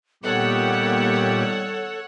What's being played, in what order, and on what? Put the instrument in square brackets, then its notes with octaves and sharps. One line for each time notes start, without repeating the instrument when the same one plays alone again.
[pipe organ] A#2 G4 [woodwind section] D#3 G3 B3 [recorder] A4 [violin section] C#5 F#5